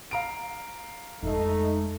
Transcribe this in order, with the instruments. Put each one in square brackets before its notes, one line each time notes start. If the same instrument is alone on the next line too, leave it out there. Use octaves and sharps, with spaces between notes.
[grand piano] F5 A#5 D7
[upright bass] F2 G#3 [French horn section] A3 D#4